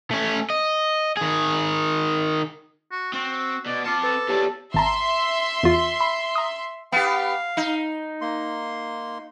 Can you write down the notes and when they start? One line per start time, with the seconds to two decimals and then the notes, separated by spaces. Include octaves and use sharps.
0.11 A3 C#4
0.50 D#5
1.17 D#3 G#4
2.91 F#4
3.13 C4 F#4
3.66 B2 D5
3.86 C4 F4 A5 D6 C#7
4.03 A4 B4
4.29 E2 G4 C#5 D5 A5
4.74 G#1 E5 A5 A#5 C6
5.63 E2 F4
6.01 B5
6.35 A#5 D#6
6.92 B3 G4 F5
7.57 D#4
8.21 A#3 C6